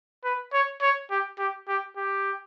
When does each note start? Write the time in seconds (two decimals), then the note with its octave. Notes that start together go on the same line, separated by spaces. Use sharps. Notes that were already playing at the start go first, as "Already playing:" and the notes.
0.24 B4
0.53 C#5
0.81 C#5
1.10 G4
1.39 G4
1.68 G4
1.97 G4